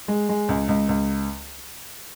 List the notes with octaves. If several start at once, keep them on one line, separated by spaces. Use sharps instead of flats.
G#3
G#3
C#2
C#2
C#2